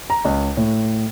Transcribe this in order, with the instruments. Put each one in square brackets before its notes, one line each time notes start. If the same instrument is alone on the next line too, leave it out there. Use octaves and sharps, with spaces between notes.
[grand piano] A#5
C#2
A2